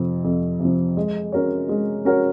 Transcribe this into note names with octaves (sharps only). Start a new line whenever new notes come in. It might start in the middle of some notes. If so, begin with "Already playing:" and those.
Already playing: F2 C3 F3
F2
C3
F3
G#3
C#4 F#4 A#4 C#5
G#3
C#4 F#4 A#4 C#5